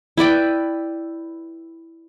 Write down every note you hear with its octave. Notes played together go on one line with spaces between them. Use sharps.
E4 B4 D5 G5